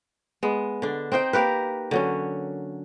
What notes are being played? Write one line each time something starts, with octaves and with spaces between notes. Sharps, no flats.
G#3 B3
D3 D4
C4 D#4 C5 G5
A#3 G4 A#4 B4
D3 F#3 C#4